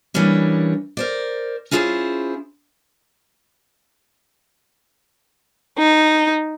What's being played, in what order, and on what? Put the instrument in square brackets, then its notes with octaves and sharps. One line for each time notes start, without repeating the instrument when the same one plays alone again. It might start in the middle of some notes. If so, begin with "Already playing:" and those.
[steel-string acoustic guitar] E3 G3 A#3 C#4 D4
A#4 C5 D5
C#4 E4 F4 G#4 B4 C5
[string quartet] D#4